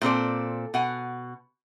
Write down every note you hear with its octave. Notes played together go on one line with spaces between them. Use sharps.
A#2 C4 A4 D5
B2 F#5 G#5